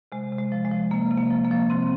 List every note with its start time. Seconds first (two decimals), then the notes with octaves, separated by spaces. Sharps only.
0.12 C3 G#3
0.32 C3
0.38 G#3
0.52 F3
0.65 G#3
0.71 F3
0.91 C3 A#3
1.11 C3
1.17 A#3
1.30 F3
1.45 A#3
1.51 F3
1.70 C3 C4